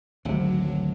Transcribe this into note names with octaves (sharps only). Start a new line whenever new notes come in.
G#1 D2 C3 F#3